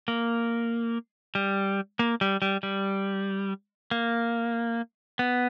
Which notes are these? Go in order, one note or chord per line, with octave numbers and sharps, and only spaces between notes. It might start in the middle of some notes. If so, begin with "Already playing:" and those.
A#3
G3
A#3
G3
G3
G3
A#3
B3